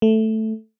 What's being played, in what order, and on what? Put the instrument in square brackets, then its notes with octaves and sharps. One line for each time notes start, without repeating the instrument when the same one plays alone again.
[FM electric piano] A3